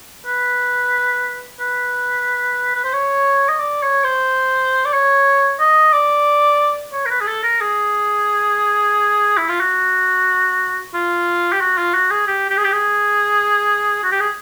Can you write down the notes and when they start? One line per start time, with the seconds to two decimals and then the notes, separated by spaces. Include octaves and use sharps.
0.26 B4
1.60 B4
2.75 B4
2.84 C5
2.93 C#5
3.49 D#5
3.60 D5
3.82 C#5
4.04 C5
4.85 D5
4.93 C#5
5.60 D#5
5.93 D5
6.93 C#5
7.06 A#4
7.10 B4
7.21 G#4
7.27 A4
7.43 A#4
7.61 G#4
9.37 E4
9.48 F4
9.60 F#4
10.94 F4
11.52 G4
11.61 F#4
11.78 F4
11.94 F#4
12.10 G#4
12.27 G4
12.50 G4
12.57 G#4
12.64 G4
12.72 G#4
14.03 F#4
14.11 G4
14.20 G#4